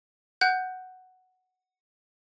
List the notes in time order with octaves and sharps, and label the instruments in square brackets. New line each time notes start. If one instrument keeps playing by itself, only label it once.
[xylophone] F#5 F#6 G6